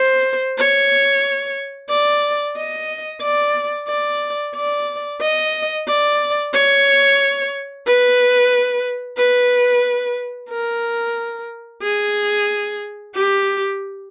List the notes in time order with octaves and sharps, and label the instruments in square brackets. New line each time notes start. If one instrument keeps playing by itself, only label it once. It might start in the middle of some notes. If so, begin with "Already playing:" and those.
Already playing: [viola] C5
C#5
D5
D#5
D5
D5
D5
D#5
D5
C#5
B4
B4
A#4
G#4
G4